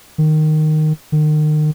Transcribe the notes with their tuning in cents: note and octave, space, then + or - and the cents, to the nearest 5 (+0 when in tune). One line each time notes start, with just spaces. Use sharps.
D#3 -10
D#3 -35